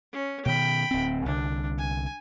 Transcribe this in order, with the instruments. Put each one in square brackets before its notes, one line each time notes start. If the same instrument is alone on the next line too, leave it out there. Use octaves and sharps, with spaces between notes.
[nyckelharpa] C#4
[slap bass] B2 D#3 [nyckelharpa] G5 B5
[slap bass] D1 C4
[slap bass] C2 D3 [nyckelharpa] D4
[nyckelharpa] G#5